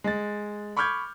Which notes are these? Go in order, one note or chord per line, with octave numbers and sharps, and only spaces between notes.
G#3 A6
B5 C#6 D6 F6 G6 G#6